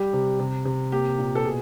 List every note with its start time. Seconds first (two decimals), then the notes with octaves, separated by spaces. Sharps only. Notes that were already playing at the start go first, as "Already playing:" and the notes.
Already playing: G3 G4
0.13 C3
0.39 C3
0.65 C3
0.92 A#3 G4
1.18 A#2
1.35 A4
1.44 B2 G#4